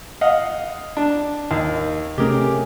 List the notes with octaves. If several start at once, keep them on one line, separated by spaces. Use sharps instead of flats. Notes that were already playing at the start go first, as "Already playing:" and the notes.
D#5 F5 F#5
D4
D#2
C3 A3 C#4 G4 G#4 A#4